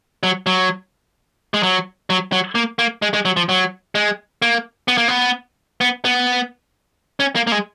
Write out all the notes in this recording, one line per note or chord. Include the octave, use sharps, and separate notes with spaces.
F#3
F#3
G#3
F#3
F#3
F#3
A#3
A#3
G#3
G#3
F#3
F3
F#3
G#3
A#3
B3
A#3
B3
B3
B3
C#4
A#3
A#3
G#3